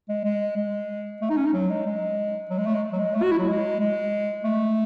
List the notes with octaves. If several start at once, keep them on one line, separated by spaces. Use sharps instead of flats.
G#3
G#3
G#3
A3
D#4
C#4
D#4
F#3
G#3
G#3
F#3
G#3
A3
G#3
F#3
G#3
A3
F#4
E4
F#3
G#3
G#3
A3